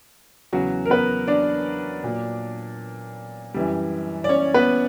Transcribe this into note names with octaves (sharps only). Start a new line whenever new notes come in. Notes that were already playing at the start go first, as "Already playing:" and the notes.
E2 C#3 F#3 F#4
A#4
B3 B4
D4 D5
A#2 F#3
F#2 E3 G3
D5
C#4 C#5
B3 B4